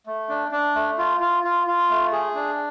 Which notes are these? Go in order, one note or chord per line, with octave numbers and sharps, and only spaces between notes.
A3
D4
D4
A3
F4
F4
F4
F4
A3
G#4
D4